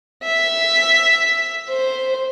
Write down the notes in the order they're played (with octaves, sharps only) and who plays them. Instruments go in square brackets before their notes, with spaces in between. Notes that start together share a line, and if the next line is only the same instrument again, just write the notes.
[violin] E5
C5